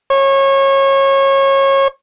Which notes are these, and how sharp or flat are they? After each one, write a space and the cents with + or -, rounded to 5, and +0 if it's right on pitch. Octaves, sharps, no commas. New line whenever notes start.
C#5 -25